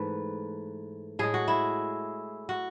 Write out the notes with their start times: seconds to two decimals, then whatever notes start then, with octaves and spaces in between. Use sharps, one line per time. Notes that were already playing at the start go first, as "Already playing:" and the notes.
Already playing: G#2 E3 A3 B4
1.19 A2 G#3 G#4
1.34 F#4
1.48 E4
2.49 F#4